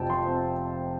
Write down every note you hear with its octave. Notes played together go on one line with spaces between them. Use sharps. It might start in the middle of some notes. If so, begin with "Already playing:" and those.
Already playing: F1 F2 C4 G5 A5
F3 C6
C4